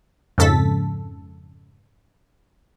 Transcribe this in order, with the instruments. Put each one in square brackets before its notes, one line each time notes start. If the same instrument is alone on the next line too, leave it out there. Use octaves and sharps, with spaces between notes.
[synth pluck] F2 G#2 C#3 A4 A6 B6